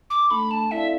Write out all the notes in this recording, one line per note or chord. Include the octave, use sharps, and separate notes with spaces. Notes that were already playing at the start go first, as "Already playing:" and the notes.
D6
A3 D4 A4 B5
A5
C4 E4 A4 D5 E5 F5